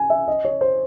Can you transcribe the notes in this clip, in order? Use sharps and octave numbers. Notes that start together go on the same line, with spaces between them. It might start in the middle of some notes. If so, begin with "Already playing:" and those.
Already playing: G#5
E5
D#5
C#5
C5